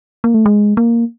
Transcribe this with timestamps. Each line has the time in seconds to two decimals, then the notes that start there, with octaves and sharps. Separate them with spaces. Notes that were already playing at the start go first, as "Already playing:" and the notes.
0.24 A#3
0.34 A3
0.46 G#3
0.77 A#3